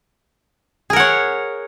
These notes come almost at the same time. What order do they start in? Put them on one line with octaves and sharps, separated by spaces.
G#4 A#4 F#5 C#5